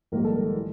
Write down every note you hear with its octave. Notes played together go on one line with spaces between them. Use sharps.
A#1 G#2 D#3 G3 A#3 A#4
A4
A#4
A2 E3